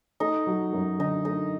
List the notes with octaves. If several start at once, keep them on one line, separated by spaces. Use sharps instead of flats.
A3 D#4
F#3
F#2
D3 D#4
A3 D#4